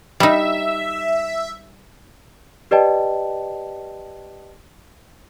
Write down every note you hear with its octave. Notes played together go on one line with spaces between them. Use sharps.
G3 D#4 E5
G4 B4 D5 D#5 G5 A5